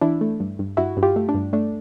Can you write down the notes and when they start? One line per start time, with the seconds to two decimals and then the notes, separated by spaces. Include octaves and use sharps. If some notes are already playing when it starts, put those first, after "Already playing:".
0.01 E3 D4 E4
0.21 A3
0.40 G2
0.59 G2
0.77 G2 E4 F#4
0.97 G2
1.03 F4 G4
1.16 A3
1.29 D4
1.35 G2
1.53 A3 D4